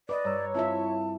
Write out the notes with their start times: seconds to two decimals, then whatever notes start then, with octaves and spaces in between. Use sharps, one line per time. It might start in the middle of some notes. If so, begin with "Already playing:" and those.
0.09 B4 D5 D#5 D6 D#6
0.24 G2 C#5 A#5 E6
0.55 C4 E4 F4 E5 A5